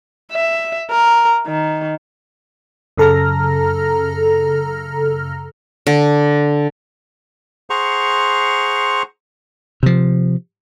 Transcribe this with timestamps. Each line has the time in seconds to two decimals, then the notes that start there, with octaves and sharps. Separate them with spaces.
0.32 E5
0.91 A#4
1.47 D#3
2.98 F#2 C#3 A4 A#5 F6 A#6
5.87 D3
7.70 G#4 C5 F#5 A#5 C6 C#6
9.83 C3 F3